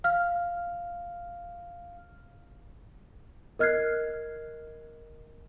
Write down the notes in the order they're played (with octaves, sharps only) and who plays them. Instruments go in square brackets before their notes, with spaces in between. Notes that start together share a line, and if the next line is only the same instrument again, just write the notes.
[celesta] F5 F6
A#4 D#5 F6 F#6 G#6 C7